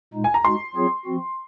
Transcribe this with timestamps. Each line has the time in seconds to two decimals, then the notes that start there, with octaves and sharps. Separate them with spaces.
0.14 A#2 G#3 D#4
0.24 G#5
0.34 A#5
0.45 G#3 D#4 F#4 C6
0.75 F#3 C4 F4 G#4 C#5
1.05 F3 C4 F#4